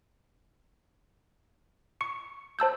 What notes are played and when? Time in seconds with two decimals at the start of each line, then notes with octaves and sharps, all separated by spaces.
2.01 C#6 C#7
2.59 C5 A5 E6 G6